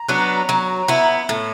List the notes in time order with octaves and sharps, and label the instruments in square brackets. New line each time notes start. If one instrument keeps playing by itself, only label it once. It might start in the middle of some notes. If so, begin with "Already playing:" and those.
Already playing: [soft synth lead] A#5
[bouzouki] F#3 B3 D4
F#3
B3 E4
A2